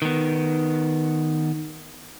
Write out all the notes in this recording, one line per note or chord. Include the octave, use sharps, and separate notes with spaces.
D#3 B3